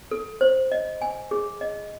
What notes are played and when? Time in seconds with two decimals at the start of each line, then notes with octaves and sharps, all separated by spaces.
0.11 A4
0.41 C5
0.72 D#5
1.02 G#5
1.31 G#4
1.61 D#5